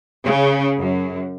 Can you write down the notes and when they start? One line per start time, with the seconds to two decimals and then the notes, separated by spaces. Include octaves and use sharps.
0.24 C#3
0.79 F#2